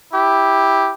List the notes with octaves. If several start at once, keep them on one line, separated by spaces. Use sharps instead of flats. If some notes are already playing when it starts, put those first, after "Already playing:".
E4 G4